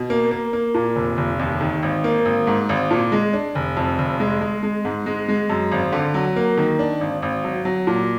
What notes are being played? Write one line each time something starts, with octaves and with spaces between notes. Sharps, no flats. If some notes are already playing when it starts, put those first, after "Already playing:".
Already playing: B2
A#3
A#3
A#3
A#2
F1
F1
D#2
D#3
G#1
A#3
G#1
G#2
G#1
A#2
G#3
D4
F1
F2
F1
G#3
G#3
G#3
G#2
G#3
G#3
F#2
G#1
D3
F#3
A#3
D#3
D4
G#1
G#1
F#3
F#3
A#2